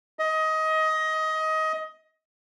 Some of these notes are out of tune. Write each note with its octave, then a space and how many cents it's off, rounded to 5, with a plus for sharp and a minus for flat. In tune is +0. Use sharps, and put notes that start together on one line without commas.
D#5 +20